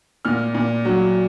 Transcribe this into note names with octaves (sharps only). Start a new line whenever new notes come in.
A#2 F6
A#2
F#3